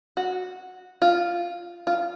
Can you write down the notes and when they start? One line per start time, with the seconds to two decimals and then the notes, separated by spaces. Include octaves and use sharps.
0.17 F#4
1.02 F4
1.87 F4